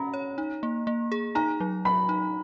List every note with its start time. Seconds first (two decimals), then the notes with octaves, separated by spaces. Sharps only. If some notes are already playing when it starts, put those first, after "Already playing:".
Already playing: C#4 A#5 B5
0.14 C#5
0.38 D#4
0.63 A#3
0.87 A#3
1.12 G#4
1.35 D#4 A#5
1.60 F#3
1.85 F#3 B5
2.09 D#4